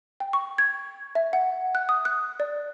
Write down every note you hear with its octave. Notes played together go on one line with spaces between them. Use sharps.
G5
C#6
G#6
E5
F#5
F#6
D#6
F#6
D5